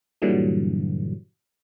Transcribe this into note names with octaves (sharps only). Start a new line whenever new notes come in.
G2 A#2 D3 E3 F#3 G3